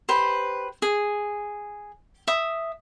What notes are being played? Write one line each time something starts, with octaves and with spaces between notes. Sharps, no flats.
G4 B4 C5
G#4
E5 D#6